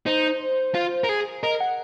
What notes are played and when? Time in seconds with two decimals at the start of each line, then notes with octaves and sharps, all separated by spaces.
0.06 D#4 C5
0.75 F4
1.04 A#4
1.09 G#4
1.43 A#4 D#5
1.60 F#5